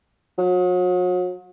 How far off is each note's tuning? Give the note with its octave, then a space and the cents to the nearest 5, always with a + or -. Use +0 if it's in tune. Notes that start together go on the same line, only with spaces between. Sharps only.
F#3 -40